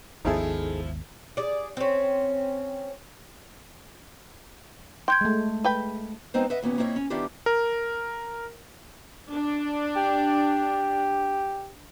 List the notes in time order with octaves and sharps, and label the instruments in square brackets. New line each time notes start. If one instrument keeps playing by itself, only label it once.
[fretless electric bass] G#1 D#2 B3 [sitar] F3 E4 [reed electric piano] D#4 G#4 A4
[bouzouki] G#4 D5
C4 C#4
[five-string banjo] G5 [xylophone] C6 G6 G#6
[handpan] G#3 A3
[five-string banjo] B4 G5 B5
[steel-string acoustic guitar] G#3 B3 C4 D#4 C5
B4 D#5 E5 F#5
D#2 A#2 B3 C#4
A#3 C4 D#4 E4 C5 C#5
C#4
D#3 B3 D4 E4 F4 G4
[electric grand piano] A#4
[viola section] D4
[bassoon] G4